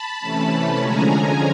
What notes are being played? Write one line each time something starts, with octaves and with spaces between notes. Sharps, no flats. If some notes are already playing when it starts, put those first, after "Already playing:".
Already playing: A5 B5
C3 E3 A3 C#4
D3 F3 G#3 C#4 G#5 A#5